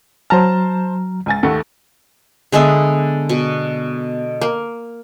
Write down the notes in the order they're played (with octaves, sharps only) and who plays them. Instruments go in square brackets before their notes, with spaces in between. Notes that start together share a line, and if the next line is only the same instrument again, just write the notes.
[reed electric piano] F#3 A#5 F6 [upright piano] C5 A5
[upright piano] C#2 G#5 A6
D#2 A3 F#5
[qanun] D3 G#3 B3 E5
B2
A#3